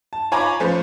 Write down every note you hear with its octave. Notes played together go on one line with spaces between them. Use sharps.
A5
F4 C#5 G#5 A#5 B5 D6
F3 A3 C#4 B4 C5